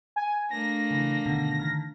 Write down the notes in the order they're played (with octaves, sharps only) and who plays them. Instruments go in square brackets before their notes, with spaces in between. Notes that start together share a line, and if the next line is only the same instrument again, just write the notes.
[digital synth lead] G#5
[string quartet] A3 A#3 D4 [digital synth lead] A#6
[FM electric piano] C#3 E3
B2 D3 D#3
D3 D#3 F6